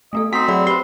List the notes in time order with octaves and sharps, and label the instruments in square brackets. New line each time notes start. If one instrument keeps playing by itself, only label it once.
[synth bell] A3 B3 A4 [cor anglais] D#5
[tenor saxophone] C4 [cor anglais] D#4 [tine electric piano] F#4 B6 [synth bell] G#5 C6 C7
[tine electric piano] F#3 [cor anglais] E4 [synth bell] G#4 D5 F#5
[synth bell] G4 C5 [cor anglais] B4 [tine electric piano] C6